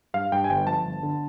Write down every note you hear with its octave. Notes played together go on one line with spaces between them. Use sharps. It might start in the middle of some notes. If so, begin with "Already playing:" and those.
G2 F5
G2 G5
G#5
G1 G5
F3 A5
G1
D3